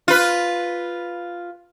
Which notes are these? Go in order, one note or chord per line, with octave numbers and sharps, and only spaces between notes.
F4 B4